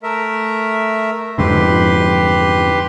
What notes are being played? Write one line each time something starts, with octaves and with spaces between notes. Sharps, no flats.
A3 A#4 E5
F2 G#2 D3 G4 B4 C6